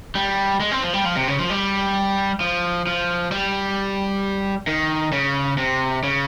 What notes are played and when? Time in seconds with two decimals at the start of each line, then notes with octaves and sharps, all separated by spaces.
0.15 G3
0.60 G#3
0.71 C4
0.83 F3
0.94 G3
1.05 F3
1.16 C3
1.28 C#3
1.39 F3
1.50 G3
2.41 F3
2.87 F3
3.32 G3
4.67 D#3
5.12 C#3
5.58 C3
6.03 C#3